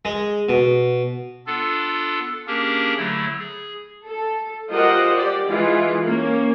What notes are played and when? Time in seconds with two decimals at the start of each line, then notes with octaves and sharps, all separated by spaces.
0.05 G#3
0.49 B2
1.47 B3 D4 F4 A4
2.47 A#3 C#4 D4 G4 G#4 A#4
2.97 D3 F#3 A3 E4 C#5
3.39 G#4
4.03 A4
4.70 G3 F4 A#4 C5 D#5 F#5
5.15 G4 D5
5.48 E3 G#3 E4 F4
6.04 A#3 C#4